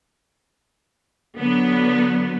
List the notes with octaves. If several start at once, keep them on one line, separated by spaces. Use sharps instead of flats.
D3 F#3 B3